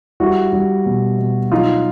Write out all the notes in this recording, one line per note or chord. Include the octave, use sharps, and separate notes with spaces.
G3 E4 F#4
G3
B2
B2
F#3 D#4 F4